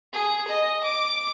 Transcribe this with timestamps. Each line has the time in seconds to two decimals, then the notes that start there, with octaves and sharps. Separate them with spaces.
0.13 G#4
0.48 D#5
0.84 D6